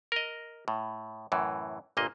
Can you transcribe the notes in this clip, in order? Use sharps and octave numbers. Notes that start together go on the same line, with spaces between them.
A#4 D#5
A2
F#2 A2 E3
G1 A#2 A#3 D#5